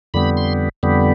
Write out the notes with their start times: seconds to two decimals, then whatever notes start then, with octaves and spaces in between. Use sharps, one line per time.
0.14 F2 D3 G3 B3 B5
0.37 C6
0.83 F2 D3 G3 B3